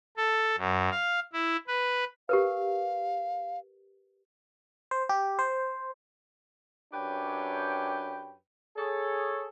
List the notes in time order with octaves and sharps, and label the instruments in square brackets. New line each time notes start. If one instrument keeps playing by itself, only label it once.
[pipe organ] A4
F#2
F5
E4
B4
[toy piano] G4 A#4 B4 [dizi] F5
[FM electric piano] C5
G4
C5
[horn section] F#2 D4 G4 B4 C#5 G5
G#4 A4 C#5